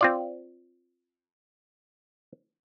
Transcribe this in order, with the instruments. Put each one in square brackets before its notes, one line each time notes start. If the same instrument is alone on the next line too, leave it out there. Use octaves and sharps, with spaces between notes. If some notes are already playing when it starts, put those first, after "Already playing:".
[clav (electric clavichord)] C4 F4 D5